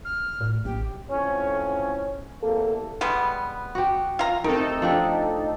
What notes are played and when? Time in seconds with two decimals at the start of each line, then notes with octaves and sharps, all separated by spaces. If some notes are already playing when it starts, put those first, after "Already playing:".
0.05 F6
0.41 A2
0.65 A1 G4
1.11 F2 A2 C#4
2.43 E2 C3 A#3 A4
3.01 G3 G#3 B3
3.75 F#4 G4
4.19 F4 A#5
4.44 C3 A3 D#4 A4 A#4
4.82 F3 D4 G4